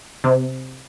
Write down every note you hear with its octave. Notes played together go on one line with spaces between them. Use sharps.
C3